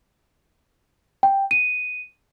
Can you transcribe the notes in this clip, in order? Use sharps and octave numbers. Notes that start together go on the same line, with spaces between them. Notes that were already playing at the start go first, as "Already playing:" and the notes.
G5
D#7